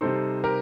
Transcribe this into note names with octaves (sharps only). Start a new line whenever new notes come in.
C3 G3 C4 D#4 A4 C5
G4 A#4